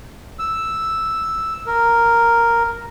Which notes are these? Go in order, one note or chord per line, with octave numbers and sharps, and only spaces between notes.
E6
A#4